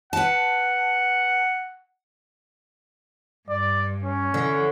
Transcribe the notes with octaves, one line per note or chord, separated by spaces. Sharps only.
B4 F#5 A5
G2 D5
C#4
D3 E3